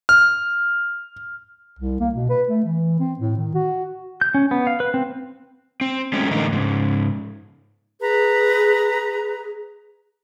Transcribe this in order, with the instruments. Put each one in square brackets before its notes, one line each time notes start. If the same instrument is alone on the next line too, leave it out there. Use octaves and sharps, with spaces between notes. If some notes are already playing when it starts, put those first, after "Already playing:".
[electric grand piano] F6
[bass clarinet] C2
A#3
B2
B4
A3
E3
C4
A2
D#3
F#4
[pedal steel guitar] G6
C#4
B3
F5
B4
C4
[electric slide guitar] C4
F#3 G#3 A3 C4 C#4
A2 D3 E3 A#3 D#4
G#2 C#3
[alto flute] G#4 [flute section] B4 A#5